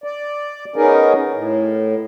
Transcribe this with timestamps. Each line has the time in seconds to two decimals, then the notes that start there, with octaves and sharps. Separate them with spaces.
0.04 D5
0.76 B3 C#4 D#4 G#4 A#4
1.34 A2